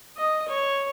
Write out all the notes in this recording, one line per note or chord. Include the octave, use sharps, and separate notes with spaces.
D#5
C#5